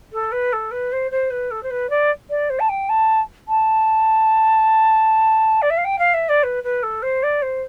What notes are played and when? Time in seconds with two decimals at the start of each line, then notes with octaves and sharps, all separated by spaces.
0.13 A4
0.32 B4
0.53 A4
0.71 B4
0.92 C5
1.11 C5
1.31 B4
1.51 A4
1.63 C5
1.71 B4
1.90 D5
2.30 D5
2.50 C5
2.60 A5
2.69 G5
2.89 A5
3.48 A5
5.62 D5
5.70 E5
5.77 F5
5.85 G5
5.99 F5
6.14 E5
6.29 D5
6.43 B4
6.64 B4
6.83 A4
7.03 C5
7.23 D5
7.42 C5